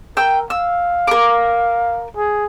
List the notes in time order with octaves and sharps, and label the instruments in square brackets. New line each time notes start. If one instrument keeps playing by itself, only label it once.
[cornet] A#4 [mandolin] G5 E6
[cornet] F5 [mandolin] E6
[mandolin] A#4 D6
[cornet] G#4